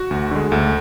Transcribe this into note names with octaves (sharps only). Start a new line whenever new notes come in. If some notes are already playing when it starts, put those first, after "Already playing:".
Already playing: F#4
D2
D3 G#3
D2 A4